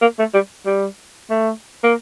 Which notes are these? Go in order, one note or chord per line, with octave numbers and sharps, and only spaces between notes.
A#3
A3
G3
G3
A3
A#3